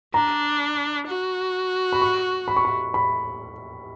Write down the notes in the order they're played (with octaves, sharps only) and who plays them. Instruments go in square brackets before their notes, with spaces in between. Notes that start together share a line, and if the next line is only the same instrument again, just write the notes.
[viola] D4 [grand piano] A#5
[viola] F#4
[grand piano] B5
C#6
B5
C#6
B5
B5